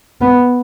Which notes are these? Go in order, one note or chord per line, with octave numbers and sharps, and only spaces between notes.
B3